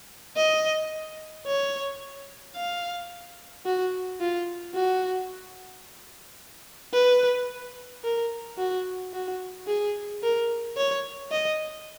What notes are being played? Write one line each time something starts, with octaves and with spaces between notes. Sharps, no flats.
D#5
C#5
F5
F#4
F4
F#4
B4
A#4
F#4
F#4
G#4
A#4
C#5
D#5